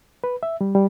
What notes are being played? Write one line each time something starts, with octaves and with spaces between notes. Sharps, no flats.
B4
E5
G3
G3